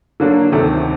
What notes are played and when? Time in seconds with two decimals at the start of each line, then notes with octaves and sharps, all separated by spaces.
0.20 D3 F#3 A#3 D4
0.52 D2 C3 D#3 A3